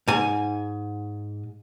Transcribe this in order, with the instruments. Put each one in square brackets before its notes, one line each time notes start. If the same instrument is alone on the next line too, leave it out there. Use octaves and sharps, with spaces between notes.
[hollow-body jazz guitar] G#2 G#5